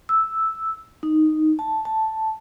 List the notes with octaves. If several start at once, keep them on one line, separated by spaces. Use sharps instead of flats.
E6
D#4
A5
A5